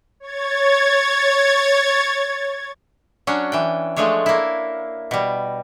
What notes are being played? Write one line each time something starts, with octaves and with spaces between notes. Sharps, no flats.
C#5 G#6 A6
F#3 C#4 D4
E3 G5
F3 G#3 A3 D4 C#5
A#3 E4
B2 G3